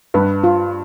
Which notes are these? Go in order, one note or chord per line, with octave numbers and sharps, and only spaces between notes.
G2 B4
F4